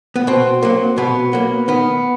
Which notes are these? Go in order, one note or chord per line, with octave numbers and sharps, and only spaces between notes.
B3
B2 C4
F#3 A#3
B2 B3
F#3 A#3
D#3 B3